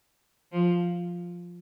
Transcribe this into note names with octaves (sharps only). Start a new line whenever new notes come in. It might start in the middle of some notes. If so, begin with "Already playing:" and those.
F3